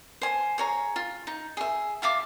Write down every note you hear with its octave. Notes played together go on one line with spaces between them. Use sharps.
C5 G#5
G#4 C#5 A#5
F4
D#4
G#4 E5
F4 E5 F5 D6